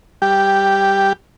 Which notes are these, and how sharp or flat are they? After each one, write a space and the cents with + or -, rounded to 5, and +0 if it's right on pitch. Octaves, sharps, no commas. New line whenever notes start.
G3 +0 G4 +0